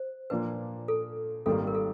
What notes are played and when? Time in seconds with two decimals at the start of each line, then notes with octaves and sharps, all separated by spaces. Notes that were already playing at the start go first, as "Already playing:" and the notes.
Already playing: C5
0.30 A#2 F3 A#3 D4 B4
0.88 A4
1.46 G#1 G#2 D#3 G3 A#3 A4
1.67 A#4
1.75 A4